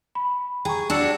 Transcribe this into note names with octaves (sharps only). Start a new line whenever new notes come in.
B5
G#4 G5 A#5 C#6
D4 F#4 D5 E6 C#7